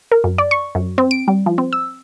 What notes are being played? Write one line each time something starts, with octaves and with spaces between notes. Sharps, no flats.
A#4
F#2
D5
C#6
F#2
C4
D7
G3
F3
C4
E6